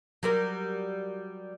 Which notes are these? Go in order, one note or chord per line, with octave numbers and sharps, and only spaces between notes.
F#3 G3 A#4